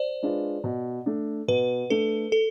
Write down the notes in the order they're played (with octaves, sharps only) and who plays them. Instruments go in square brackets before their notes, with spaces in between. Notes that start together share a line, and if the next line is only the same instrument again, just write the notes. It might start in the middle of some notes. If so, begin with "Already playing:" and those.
Already playing: [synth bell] C5 D5
[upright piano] G#3 D4 F4 B4
B2
A3 D4
[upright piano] B2 [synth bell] B4
[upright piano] A3 D4 [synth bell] A4
[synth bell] A4